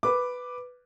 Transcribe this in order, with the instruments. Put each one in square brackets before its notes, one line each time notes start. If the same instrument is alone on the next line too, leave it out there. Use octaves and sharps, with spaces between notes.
[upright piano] B4 D6